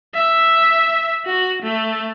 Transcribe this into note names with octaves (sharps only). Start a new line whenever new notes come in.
E5
F#4
A3